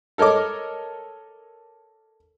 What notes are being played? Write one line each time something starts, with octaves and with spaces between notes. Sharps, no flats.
A4 A#4 C#5 D#5 D6